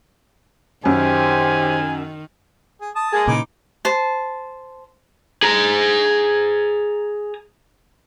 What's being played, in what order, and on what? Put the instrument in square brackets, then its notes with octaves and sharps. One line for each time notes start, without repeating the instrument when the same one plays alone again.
[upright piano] F#2 [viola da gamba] D#3 [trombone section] G4 C5 [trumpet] G#5
[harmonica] G#4
A5 D#6
[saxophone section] G#3 A#3 G#4
[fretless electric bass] A#2 C#3 [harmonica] E3 D#4 D6
[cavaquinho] C5 A5
[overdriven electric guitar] G#4 A#5